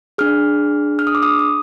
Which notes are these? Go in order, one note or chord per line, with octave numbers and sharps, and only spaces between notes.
D4 G#4 F6
F6
D#6
D6
D#6
D#6